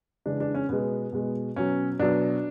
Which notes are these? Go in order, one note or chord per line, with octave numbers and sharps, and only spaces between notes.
C#3 E3 G#3 D4
D4
C#4
B2 G#3 B3
B2 G#3
B2 F#3 C#4
B2 F#3 D4